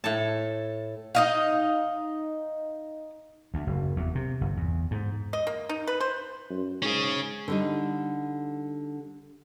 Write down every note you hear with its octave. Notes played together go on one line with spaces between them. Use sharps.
A2 A4 A5
D#4 D#5 F5
D2
F#1
E2
C3
G1
E2
G#2
D#5
A#3
D#4
B4
C5
F#2
G#2 C#4 G#4
D3 G3 D#4